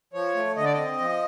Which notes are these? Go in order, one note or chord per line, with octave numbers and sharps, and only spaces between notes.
F3 C#5
A3
D3 D#5
D5
C4 D#5
F3